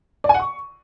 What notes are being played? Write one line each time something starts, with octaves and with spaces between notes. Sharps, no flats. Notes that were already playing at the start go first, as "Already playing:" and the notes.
D5
G#5
F#5
C#6